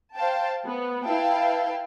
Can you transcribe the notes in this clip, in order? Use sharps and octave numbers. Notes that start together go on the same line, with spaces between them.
C5 F5 G5 A5
B3
E4 B4 F5 G5 A5